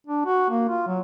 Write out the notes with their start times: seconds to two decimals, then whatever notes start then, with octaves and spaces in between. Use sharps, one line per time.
0.07 D4
0.26 F#4
0.50 A#3
0.69 F4
0.87 F#3